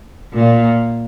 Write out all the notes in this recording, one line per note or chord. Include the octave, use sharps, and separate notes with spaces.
A#2 A#3